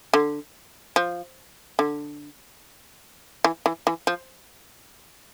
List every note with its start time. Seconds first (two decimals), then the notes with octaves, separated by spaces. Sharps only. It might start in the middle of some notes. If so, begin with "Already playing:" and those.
0.14 D3
0.96 F3
1.79 D3
3.44 E3
3.66 E3
3.87 E3
4.07 F3